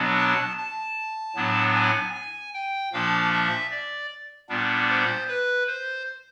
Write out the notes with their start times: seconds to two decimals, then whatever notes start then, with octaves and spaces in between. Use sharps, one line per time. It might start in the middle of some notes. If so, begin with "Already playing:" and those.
Already playing: B2 F#3 B3 D4
0.18 A5
0.58 A5
1.36 A2 F#3 B3 D4
1.75 G#5
2.15 G#5
2.54 G5
2.93 A#2 F3 A#3 D4 F5
3.32 E5
3.71 D5
4.49 A#2 G3 B3 D4
4.89 C5
5.28 B4
5.67 C5